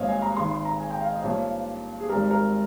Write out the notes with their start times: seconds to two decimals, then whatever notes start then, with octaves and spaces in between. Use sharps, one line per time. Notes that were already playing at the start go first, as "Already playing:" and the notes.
Already playing: G#1 G2 G3 A#3 C5 C#5 D#5 F5
0.08 G#5
0.22 A#5
0.37 G#1 G#2 D#3 C6
0.51 C6
0.65 A#5
0.80 G#5
0.91 G5
1.01 F5
1.12 D#5
1.23 G2 F3 A#3 C#5
2.00 G#4
2.09 G#1 G#2 G3 A#4
2.31 A#4